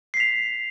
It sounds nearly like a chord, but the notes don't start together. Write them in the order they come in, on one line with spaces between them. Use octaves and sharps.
C7 B6 F7